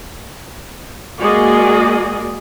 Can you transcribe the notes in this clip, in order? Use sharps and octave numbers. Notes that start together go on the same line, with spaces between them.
G#3 A#3 F#4 G#4 D5 D#5